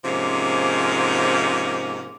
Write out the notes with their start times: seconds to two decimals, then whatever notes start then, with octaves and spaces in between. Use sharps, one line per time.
0.05 G#2 C3 F3 G#3 A#3 C#4